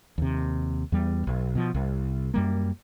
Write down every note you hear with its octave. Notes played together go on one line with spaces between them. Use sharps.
D#2 C3
E2 G3 B3
B1
B2 F3
C2
F#2 G3 A#3